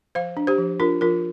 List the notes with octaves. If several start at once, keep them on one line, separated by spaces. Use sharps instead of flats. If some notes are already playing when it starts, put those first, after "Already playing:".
F3 C5 F5
D4
G4 C5
F3
D4 F4 A#4
F3 F4 A#4